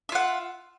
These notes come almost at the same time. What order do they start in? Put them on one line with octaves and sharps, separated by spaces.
E5 F4 F#5